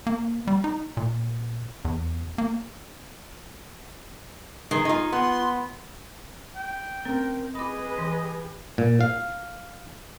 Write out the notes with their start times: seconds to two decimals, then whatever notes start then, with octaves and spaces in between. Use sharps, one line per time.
0.07 A#3
0.47 G3
0.64 D#4
0.97 A#2
1.85 E2
2.38 A#3
4.71 D#3 G#4
4.85 D#4 F4 G#5
5.12 B3 C6
6.56 G5
7.05 C4 C#4 A#4
7.55 G#4 B4 D#5 B5 D6
7.98 E3
8.78 A#2
9.01 F5